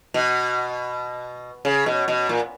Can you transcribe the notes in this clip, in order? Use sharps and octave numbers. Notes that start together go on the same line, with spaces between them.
B2
C#3
B2
B2
A#2